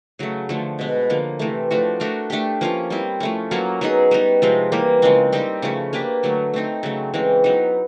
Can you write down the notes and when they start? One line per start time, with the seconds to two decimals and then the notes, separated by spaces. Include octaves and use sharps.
0.19 C#3 F#3 A3
0.49 D3 F3 A3
0.79 B2 G#3 B3
1.10 D3 F3 A#3
1.39 C3 E3 A3
1.71 F3 A3 D4 F#4
2.00 A3 D4 F#4 A#4
2.30 A3 D4 G4
2.61 F3 A#3 C#4 F4
2.90 G3 C4 E4
3.20 F3 A3 C#4
3.51 F#3 A#3 C#4 F4
3.81 F#3 B3 D#4 G#4
4.11 G3 B3 D#4
4.42 C3 F3 G#3 C4
4.72 E3 G3 A#3
5.02 C#3 F3 G#3 C4
5.32 G3 C4 D#4 G4
5.62 C#3 F3 A3 C#4
5.93 A#3 D4 G4 B4
6.23 D3 F#3 A3
6.54 A3 C4 D#4
6.83 C#3 F#3 A3 C4
7.14 C#3 E3 G#3 C4
7.44 F#3 B3 D#4